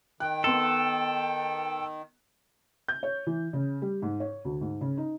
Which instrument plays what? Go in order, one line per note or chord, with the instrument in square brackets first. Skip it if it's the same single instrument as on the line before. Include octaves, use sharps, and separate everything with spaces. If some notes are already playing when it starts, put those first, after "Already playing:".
[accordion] D#3 [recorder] G5 [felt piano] F#6
[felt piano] B3 C6 [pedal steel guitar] A4
[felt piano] G6
C#5
E3
C#3
G3
G#2
C#5
D2
G#2
C#3
D#4